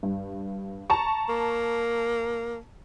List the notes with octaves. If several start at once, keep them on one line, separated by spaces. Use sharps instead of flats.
G2
A5 A#5 C#6
A#3